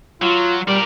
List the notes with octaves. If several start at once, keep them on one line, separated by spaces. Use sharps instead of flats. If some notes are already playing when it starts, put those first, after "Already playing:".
F#3 F4
G3 A#4 D5